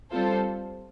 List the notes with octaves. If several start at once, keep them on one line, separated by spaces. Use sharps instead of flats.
G3 C4 F4 A4 C5